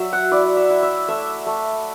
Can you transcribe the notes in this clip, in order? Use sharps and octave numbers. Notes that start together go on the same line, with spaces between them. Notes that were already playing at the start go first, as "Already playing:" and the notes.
Already playing: F#3 E5
F#5
E4 D5
E5
E4
E5
A3 E5
A3